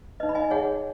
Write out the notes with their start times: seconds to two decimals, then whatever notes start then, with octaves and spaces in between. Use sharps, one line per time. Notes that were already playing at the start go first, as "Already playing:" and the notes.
0.20 D#4 B4 D#5
0.29 B5
0.35 D#5 G#5
0.50 D#4 G#4 C#5 F#5